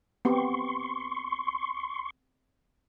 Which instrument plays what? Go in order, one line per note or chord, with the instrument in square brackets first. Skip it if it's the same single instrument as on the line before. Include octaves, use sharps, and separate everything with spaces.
[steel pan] B3 C4 G4 [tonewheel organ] C6 C#6